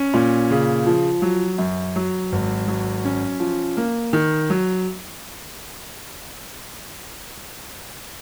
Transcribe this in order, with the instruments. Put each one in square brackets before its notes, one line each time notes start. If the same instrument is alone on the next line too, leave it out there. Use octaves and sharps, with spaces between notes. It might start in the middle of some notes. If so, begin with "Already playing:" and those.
Already playing: [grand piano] C#4
A#2
C#3
F3
F#3
F#2
F#3
G#1
F#3
C#4
F3
A#3
D#3
F#3